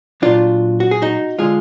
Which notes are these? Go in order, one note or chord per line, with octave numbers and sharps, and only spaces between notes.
A#2 F#3 D4 F4
F#4
G#4
D#4 F#4
D3 G#3 F4 G#4